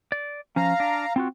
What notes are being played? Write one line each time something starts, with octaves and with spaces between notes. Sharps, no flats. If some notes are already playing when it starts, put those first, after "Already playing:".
D5
F3 C#4 F5 A#5
D4
C4 F4 F#4